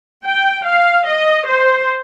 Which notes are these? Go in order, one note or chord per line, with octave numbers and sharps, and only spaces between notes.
G5
F5
D#5
C5